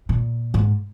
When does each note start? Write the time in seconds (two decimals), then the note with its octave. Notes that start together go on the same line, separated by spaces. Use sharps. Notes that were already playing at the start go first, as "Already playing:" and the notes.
0.09 A#2
0.54 G#2